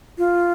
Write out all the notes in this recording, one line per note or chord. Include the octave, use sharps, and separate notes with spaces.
F4